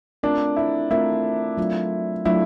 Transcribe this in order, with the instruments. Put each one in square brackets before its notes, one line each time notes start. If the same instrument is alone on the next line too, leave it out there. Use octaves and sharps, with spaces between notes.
[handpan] A3 C4 F4 A#4 [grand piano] D4
[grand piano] E4
[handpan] A3 C4 F4 A#4 [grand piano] E4
[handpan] F#3 A3 D4 F4
[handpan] F#3 A3 D4 F4 [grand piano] E4